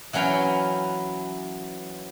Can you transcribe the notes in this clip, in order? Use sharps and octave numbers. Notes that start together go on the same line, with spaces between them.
E3 F#3 C#4 B4 F5 G5